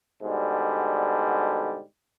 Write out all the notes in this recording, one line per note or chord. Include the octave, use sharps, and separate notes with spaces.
G#2 B2 D3 G3